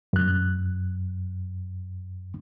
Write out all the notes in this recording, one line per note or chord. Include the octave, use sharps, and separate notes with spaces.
F#2 F#6